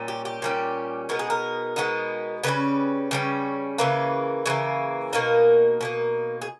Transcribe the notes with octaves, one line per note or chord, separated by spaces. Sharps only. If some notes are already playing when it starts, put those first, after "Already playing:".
Already playing: A#2 G3 C#4
G4
G4
A#2 G3 C#4
B2 G#3 B3 D#4 A#4
G#4
A#4
B2 G#3 B3 D#4
C#3 G3 C#4 B4
C#3 G3 C#4
C#3 E3 A#3 B4
C#3 E3 A#3
B2 A#3 D#4 A#4
B2 A#3 D#4
G#4